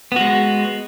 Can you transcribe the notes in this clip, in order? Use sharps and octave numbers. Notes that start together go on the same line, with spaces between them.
G#3 B3 F#4